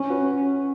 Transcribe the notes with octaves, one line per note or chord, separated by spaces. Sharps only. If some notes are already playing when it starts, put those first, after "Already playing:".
Already playing: C#4
F#4 B4